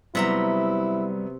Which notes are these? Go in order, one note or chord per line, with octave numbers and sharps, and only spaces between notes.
C3 F#3 G3 B3 E4 E5 A#5